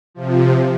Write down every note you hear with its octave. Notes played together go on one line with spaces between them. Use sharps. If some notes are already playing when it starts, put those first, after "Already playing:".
C3 F3